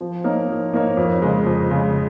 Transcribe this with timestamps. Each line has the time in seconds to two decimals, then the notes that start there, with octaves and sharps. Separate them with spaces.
0.01 F3
0.24 A#3 D#4 A#4 C#5
0.48 F3
0.74 A#3 D#4 A#4 C#5
0.97 F2
1.22 C#3 G#3
1.46 F2
1.71 C#3 G#3